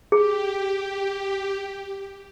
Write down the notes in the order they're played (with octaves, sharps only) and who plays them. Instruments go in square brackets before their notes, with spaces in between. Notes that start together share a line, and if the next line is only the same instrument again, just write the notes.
[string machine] G4 [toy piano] G#4